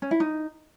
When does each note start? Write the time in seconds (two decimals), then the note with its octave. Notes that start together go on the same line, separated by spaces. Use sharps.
0.02 C#4
0.11 E4
0.20 D#4